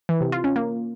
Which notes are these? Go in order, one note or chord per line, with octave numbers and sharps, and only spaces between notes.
E3
C3
F4
C#4
A#3